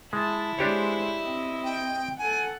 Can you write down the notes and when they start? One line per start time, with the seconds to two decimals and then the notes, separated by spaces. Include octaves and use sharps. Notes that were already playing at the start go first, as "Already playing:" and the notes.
0.13 G#3 E4 A5
0.59 G#3 D4 G4 C5 C#5
1.21 C4 D#5
1.64 G5
2.18 A4 F#5 G#5